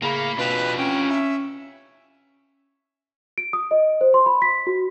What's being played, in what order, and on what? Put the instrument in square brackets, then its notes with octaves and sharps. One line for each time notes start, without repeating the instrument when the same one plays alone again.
[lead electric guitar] A2 B5 [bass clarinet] C#3 [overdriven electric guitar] A#3
[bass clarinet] B2 [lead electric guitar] C4 D4 [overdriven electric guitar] F4 G4 [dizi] B4
[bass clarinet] C#4 [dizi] G5
[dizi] E5
[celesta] D7
D#6
D#5
C5
C6
B5
B6
F#4